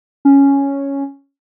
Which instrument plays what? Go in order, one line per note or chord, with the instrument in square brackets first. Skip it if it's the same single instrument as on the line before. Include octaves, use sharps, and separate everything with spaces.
[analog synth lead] C#4